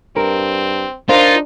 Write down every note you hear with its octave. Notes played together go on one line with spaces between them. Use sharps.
G2 C4 A#4
D4 D#4 F4 A#4 C5